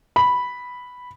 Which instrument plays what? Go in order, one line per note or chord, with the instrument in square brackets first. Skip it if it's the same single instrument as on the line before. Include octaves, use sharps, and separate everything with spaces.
[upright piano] B5